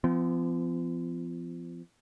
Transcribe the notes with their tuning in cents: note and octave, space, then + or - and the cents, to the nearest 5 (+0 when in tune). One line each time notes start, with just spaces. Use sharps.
F3 -25 C4 -45